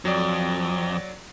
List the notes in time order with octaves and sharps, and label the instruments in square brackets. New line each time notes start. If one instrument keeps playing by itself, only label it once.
[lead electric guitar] F2 [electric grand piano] F#3 D5